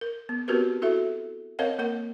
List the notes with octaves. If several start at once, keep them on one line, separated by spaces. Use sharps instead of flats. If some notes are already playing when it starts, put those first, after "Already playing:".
A#4
B3
B3 C4 F#4 G4 A#4 B4
E4 F#4 A4 E5
C4 A#4 C#5 D#5 F5 F#5
A#3 A#4 F#5